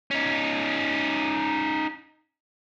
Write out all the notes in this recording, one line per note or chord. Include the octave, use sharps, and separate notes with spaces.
C#4 D#4